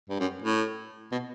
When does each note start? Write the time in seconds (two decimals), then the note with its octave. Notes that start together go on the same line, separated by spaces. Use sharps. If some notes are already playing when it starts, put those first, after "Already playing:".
0.09 G2
0.20 F#2
0.42 A2
1.12 B2